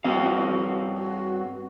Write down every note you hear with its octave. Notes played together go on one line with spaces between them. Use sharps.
G2 C4 F#4 F5
F#4